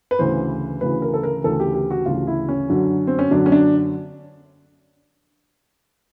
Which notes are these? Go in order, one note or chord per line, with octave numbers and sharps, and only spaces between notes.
B4
D2 C#3 E3 C5
D2 C#3 E3 B4
A#4
A4
A#4
D2 C#3 E3 A4
G4
G4
F#4
D2 C#3 E3 F4
E4
C#4
F#2 D3 F#3
C4
C#4
F#2 D3 F#3 D4
C#4
D4